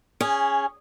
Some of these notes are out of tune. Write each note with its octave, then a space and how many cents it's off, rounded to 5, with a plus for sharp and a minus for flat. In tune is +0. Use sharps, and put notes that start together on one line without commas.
C#4 +0 G#4 -15